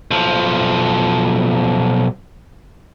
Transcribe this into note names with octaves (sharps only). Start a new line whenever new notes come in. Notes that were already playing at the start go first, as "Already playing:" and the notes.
B1 F3